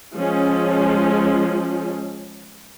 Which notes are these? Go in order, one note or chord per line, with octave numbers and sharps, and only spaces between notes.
F3 G#3 C#4